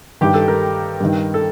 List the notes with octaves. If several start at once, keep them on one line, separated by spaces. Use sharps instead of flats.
G2 D#3 G4
A4
A#4
G2 D#3
A4